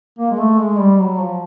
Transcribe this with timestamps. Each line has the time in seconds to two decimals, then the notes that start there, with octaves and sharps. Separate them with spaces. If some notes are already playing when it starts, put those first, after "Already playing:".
0.18 A#3
0.31 G#3
0.39 A3
0.59 G#3
0.79 G3
1.00 F#3
1.20 F3